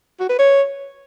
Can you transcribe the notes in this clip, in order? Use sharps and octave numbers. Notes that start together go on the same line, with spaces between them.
F#4
B4
C#5